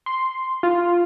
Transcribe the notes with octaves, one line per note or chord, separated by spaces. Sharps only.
C6
F4